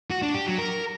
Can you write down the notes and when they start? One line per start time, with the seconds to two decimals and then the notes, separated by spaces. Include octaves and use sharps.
0.11 F#4
0.22 D4
0.34 G4
0.46 F#3
0.58 A#4